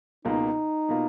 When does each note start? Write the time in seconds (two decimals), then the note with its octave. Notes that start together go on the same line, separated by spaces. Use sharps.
0.25 C#2 B2 A#3 D#4 F4
0.89 B2 A#3 F4